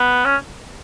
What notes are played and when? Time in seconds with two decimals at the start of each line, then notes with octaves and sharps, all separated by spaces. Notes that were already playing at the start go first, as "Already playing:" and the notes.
Already playing: B3
0.25 C#4